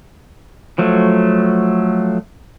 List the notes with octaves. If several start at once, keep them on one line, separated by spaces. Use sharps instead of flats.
F3 F#3 A3